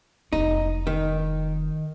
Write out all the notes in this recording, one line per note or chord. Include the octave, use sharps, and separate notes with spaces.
F1 G#3 D#4
D#3